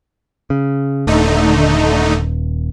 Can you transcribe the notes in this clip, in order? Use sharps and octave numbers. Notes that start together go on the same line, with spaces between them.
C#3
D#1 D3 A3 D#4